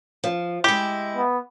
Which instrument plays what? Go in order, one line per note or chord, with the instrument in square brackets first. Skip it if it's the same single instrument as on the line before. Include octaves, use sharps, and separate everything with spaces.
[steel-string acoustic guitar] F3
[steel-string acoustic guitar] G#3 E4 [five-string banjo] G4
[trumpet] B3